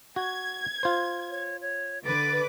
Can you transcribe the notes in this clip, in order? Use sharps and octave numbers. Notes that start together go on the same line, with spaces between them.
F#4 G#6
F4 C5
C#5
C#5
D3 B4 D6 A6